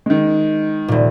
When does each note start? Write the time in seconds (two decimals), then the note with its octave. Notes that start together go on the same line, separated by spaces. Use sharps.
0.06 D#3 G#3
0.88 D#1 A#2